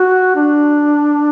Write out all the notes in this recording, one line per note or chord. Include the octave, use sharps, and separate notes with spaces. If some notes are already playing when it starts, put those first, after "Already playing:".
Already playing: F#4
D4